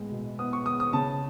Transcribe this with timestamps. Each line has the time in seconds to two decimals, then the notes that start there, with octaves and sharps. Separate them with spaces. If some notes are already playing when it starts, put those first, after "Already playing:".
Already playing: A2 G#3 B3
0.12 B2
0.39 B3 D#6
0.53 C#6
0.66 B3 D#6
0.80 D#6
0.93 C#3 A5